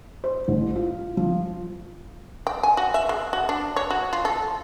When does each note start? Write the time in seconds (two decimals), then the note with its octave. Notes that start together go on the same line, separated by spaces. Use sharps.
0.24 C5
0.48 A1
0.76 F4
1.17 F3
2.47 G5
2.63 G#5
2.77 F#4
2.94 E5
3.09 G#3
3.33 F#4
3.49 D4
3.76 C#5
3.90 F#4
4.13 F4
4.25 A4